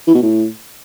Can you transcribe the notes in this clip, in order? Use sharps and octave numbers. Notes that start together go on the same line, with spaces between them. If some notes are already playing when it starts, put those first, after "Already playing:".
E3
B2
A2